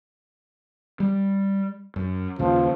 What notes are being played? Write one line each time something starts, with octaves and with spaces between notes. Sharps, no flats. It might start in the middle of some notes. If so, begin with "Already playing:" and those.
G3
F#2
D#2 C#3 F3